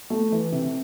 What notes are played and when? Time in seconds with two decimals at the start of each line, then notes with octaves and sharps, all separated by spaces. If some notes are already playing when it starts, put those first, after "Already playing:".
0.10 A3
0.32 E3
0.52 C3